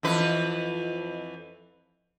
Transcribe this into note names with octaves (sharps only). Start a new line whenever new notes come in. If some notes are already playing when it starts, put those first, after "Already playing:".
F2 E3 B4